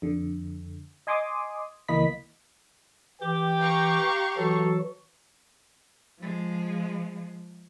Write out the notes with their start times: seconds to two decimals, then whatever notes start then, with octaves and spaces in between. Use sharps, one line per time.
0.02 F2 D3
1.07 D#5 G#5 C6 D6 D#6
1.88 C#2 E3 A#3 D#5 B5 B6
3.22 E3 G4 G5 D6
3.59 F5 A#5 C#6
4.37 E3 F#3 F#4 A4
6.19 F3 G#3